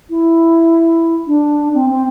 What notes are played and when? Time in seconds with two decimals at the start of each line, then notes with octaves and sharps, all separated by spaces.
0.10 E4
1.26 D4
1.74 C4
1.89 C4